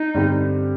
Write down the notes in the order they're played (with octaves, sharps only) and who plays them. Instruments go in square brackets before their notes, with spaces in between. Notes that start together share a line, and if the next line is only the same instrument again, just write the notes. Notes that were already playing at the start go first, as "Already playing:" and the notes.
Already playing: [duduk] D#4
[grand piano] G2 D3 G3 C4 G4